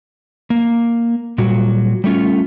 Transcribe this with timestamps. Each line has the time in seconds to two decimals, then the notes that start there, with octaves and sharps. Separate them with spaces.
0.50 A#3
1.38 A#2 F#3 G3 F#4
2.04 G3 A3 C#4 F4